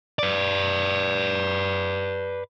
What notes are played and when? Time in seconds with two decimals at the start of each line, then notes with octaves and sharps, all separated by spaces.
0.19 B4 D5